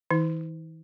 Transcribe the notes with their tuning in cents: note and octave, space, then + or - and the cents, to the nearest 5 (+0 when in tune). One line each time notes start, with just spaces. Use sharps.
E3 -40 E4 -45